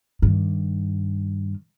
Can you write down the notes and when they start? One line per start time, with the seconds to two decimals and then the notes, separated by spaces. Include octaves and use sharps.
0.22 G2 D#3